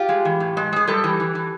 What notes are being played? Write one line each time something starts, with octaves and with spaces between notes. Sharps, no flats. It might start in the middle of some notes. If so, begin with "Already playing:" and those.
Already playing: F4 G4
G#3
E3
A2
G#3
G#3 G#4
G3 G4 A4
E3
E3
E3